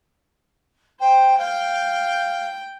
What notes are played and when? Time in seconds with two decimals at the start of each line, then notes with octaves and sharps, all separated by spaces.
1.00 C5 G5
1.38 F5 G5